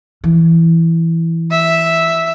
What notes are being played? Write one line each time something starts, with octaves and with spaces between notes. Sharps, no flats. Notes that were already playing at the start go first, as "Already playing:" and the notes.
E3
E5